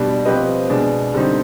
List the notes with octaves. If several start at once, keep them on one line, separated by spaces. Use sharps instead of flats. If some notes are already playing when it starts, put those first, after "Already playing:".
Already playing: B2 G3 D4
F3 C4 G4 B4 D#5
B2 G#3 D4
D3 G3 C4 D#4